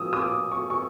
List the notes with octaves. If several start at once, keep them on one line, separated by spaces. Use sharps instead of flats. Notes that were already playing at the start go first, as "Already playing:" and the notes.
Already playing: F3 G#3 D#6 E6
D#6
D6
C#6
C#6